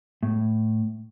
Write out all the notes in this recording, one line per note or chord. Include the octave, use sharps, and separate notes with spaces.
A2